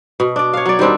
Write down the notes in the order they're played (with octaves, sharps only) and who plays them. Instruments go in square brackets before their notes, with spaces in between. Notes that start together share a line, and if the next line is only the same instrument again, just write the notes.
[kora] B2
D4 D5
C#5 F5
F#3 D5
D#3 G3 C4 D4